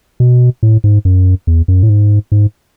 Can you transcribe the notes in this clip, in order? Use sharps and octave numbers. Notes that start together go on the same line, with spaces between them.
B2
A2
G#2
F#2
E2
F#2
A2
G#2
G#2